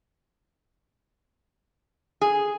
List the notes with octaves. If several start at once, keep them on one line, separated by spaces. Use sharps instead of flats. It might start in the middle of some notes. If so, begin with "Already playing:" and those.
G#4